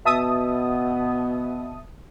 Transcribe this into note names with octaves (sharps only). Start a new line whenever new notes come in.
B2 B3 E5 A5 D#6